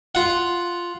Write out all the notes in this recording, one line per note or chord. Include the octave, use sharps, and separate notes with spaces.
F4 F#5